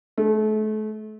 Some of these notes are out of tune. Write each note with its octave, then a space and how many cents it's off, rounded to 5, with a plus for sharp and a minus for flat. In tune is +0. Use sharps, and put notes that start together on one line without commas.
A3 -35